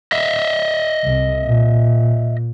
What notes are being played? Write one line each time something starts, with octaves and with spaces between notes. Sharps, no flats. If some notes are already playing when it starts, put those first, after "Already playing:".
D#5 E5
C2
A#2